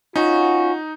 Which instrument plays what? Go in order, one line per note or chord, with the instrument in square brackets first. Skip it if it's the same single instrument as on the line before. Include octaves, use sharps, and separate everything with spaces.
[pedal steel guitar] C#4 F#4 [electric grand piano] D#4 [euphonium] F4